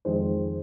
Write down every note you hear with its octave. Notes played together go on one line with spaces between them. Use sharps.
F2 D#3 G#3 C5